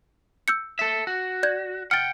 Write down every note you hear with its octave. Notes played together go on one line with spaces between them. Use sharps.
E6 G6 C#7
A4 E5
F#4
D5 G6 G#6
F#5 G5 F6 A6